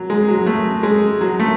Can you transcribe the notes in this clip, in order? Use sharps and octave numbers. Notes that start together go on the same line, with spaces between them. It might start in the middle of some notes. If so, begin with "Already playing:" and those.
Already playing: F#3
G#3
F#3
A3
G#3
F#3
A3